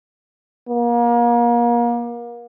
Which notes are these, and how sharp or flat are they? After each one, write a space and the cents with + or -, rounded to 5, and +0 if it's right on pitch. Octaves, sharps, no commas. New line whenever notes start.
A#3 +30